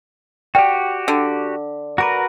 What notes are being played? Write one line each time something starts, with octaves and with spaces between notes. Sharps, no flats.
F#4 G4 B4 D5 G5
D3
F#4 A#4 B4 A#5 D6